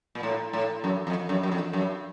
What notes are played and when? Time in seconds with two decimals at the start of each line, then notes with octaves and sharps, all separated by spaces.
0.15 A#2
0.23 A2
0.53 A2
0.84 F#2
1.07 F2
1.29 F#2
1.43 F#2
1.52 F2
1.73 F#2